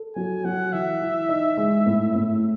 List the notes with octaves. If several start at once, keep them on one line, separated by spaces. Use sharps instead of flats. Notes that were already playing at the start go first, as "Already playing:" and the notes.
Already playing: A4
F#3 G#5
F#3 F#5
E3 E5
E3
D#4
G#3
A2
A2